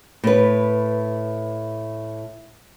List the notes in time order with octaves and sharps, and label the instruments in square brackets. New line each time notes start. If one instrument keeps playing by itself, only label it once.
[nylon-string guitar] A2 B4